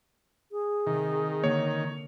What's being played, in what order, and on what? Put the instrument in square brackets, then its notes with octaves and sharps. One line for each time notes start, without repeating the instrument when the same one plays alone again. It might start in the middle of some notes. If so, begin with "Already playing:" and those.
[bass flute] G#4
[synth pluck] C3 [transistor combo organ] D#3
[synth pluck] D3 A#3 [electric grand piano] C#5